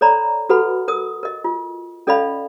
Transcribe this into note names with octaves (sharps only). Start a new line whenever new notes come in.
A4 C#5 D5 A#5 B5
F#4 A4 B4 F#5 B5
A#4 D#6
A#4 D#5
F4
C#4 A4 D5 D#5 F5 B5